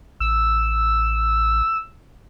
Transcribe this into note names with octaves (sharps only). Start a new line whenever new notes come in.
A1 E6